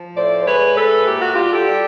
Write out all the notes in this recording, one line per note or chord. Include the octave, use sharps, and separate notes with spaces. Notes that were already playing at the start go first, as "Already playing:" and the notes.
Already playing: F3
A2 C5 D5
C5
G#3 B4 C#5
A2 A4 B4
A#2 G4
F#4
G3 F4 G4
G4 A4
G3